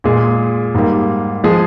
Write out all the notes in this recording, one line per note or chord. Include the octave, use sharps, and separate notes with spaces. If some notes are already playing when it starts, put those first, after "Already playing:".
A#2 G#3 G#4
G#2 G3 A#3
F3 G#3 G#4